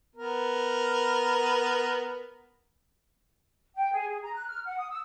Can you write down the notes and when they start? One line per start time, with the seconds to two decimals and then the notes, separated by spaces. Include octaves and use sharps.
0.16 B3 A#4
3.76 G5
3.92 G#4
4.09 G#4
4.22 A#5
4.35 F#6
4.48 F6
4.65 F#5
4.78 D#6
4.90 E6